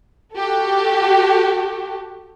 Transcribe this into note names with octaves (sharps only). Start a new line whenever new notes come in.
F#4 G4 A4